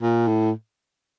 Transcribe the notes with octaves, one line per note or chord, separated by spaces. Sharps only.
A#2
A2